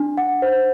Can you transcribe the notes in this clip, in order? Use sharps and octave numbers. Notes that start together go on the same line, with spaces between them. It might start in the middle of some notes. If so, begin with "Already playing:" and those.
Already playing: D4
F#5
C5